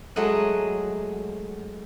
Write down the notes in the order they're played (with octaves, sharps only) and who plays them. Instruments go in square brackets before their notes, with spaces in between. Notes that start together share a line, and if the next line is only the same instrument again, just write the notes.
[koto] F#3 G#3 A3 D#5 F#5